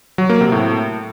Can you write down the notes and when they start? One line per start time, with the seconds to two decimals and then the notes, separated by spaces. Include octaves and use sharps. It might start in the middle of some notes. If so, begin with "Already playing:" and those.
0.18 F#3
0.30 A#3
0.41 C3
0.52 A2